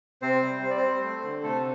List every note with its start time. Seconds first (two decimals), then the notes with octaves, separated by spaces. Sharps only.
0.22 C3 C4 C5
0.42 G3
0.63 G3 C5
0.70 D5
0.77 C4 C5
0.83 G3
1.02 A3
1.24 D3
1.43 C3 A3 A4